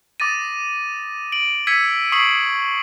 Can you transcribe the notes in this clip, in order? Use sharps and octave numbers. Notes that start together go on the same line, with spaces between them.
D6 D#6 A6 A#6 D#7
D7 F#7
E6 G#6 B6 C#7 D#7
C#6 D#6 B6 C7 D7 F#7